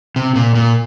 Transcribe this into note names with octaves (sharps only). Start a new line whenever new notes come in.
C3
A#2
A#2